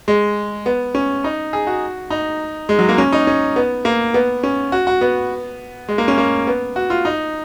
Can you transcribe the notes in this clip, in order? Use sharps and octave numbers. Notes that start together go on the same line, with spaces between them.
G#3
B3
C#4
D#4
G#4
F#4
D#4
G#3
F#3
A#3
C#4
D#4
C#4
B3
A#3
B3
C#4
F#4
F#4
B3
G#3
A#3
C#4
A#3
B3
F#4
F4
D#4